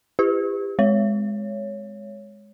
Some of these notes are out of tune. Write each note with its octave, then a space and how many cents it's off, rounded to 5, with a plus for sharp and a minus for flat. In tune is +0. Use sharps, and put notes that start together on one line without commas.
E4 +40 G4 +25 B4 +40
G#3 +0 C#5 +5